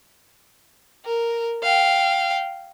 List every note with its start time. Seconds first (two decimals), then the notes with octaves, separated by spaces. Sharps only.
1.05 A#4
1.63 F5 G5